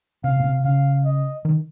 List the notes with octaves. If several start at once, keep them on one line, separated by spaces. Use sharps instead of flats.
C3 F5
A#2
C3
C#3 F5
D#5
D#3